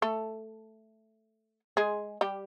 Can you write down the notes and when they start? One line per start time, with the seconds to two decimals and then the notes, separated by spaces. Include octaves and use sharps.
0.02 A3 A4
1.77 G#3 G#4
2.21 G3 G4